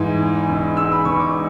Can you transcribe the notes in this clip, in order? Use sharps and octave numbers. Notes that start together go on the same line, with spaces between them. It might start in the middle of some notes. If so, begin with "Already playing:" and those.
Already playing: G#2 E3
E2
E1
E1 E6
B5
E1 C#6
D6